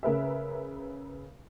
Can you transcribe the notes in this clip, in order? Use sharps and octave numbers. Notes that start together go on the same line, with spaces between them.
C#3 A#4 B4 E5